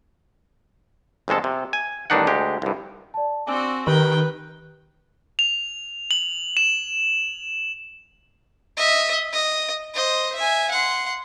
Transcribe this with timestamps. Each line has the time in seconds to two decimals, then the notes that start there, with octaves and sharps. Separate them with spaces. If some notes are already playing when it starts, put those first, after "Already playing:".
1.28 G1 F2 G#3 A4 A5
1.44 C3
1.73 G#5
2.10 A1 G2 D#3 D4 D#4 F#5
2.27 D2 G#3 G4
2.62 C2 G2
3.14 D5 A5
3.47 C4 D4 F#4 G#5 E6
3.87 D#3 G4 A#4 B4 G5
5.39 F7
6.11 F#7
6.57 E7
8.77 D#5 E5
9.33 D#5
9.94 C5 D#5
10.35 E5 G#5
10.71 F#5 C6